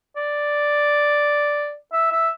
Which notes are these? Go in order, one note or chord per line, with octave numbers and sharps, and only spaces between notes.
D5
E5
E5